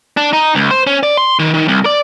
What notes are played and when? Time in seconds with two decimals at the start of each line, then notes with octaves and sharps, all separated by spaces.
0.17 D4
0.33 D#4
0.55 C#2
0.71 C5
0.87 C#4
1.03 D5
1.17 C6
1.39 D#3
1.54 D#3
1.68 C2
1.86 D5